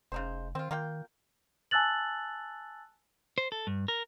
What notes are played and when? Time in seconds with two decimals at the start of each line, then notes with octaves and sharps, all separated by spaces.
0.12 F1 C#3 D#4 C5
0.55 D#3 C4 F4
0.71 D#3 A#3 F4 G5
1.71 G#5 A5 E6 F#6 A6 F#7
3.38 C5
3.52 A4
3.67 G2
3.88 A#4